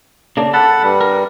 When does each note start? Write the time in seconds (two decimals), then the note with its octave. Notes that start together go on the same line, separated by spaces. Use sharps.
0.37 C#3 A#3 D4
0.53 A4 F#5 A5 B5
0.83 G2 G3
1.01 A#4